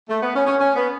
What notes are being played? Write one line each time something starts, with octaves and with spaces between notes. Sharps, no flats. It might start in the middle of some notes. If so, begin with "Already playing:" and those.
A3
B3
C#4
C#4
C#4
B3